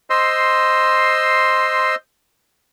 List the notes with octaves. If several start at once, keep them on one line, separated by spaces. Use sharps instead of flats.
C5 D#5 C6 E6